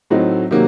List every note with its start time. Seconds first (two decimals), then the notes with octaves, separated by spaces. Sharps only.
0.10 A2 F#3 A3 C4 D#4
0.51 C3 D#3 F#3 A#3